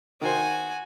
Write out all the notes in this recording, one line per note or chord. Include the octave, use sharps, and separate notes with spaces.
D#3 F#4 C5 G#5